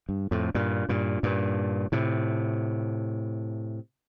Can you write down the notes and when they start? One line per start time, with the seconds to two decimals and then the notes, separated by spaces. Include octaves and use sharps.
0.09 G2
0.31 F2 A2
0.55 G2 A#2
0.89 G2 A#2
1.23 G2 A#2
1.92 A2 C3